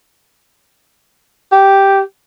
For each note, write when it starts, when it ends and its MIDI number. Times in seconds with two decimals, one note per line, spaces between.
1.52 2.00 67